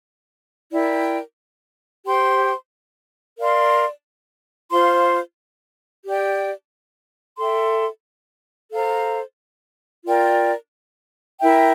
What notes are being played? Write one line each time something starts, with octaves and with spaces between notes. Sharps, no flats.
E4 A#4 D5 G5
G4 C5 G5 C6
A#4 D5 F5 C6
F4 C5 F5 C6
G4 D5 G5
A4 E5 G5 C6
A4 C5 F5 A#5
F4 A#4 D5 G5
E4 A#4 E5 G5